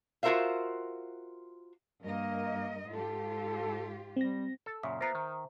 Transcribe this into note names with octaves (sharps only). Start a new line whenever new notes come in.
F4 F#4 A#4 C5 E5 F5
G2 A#3 A#4 D#5
G#2 F4 G4 A4
G3 C4 A#6
A4
F#2 A#2 C#3 E5
B3 F4 A#4 C5 A#5
D#3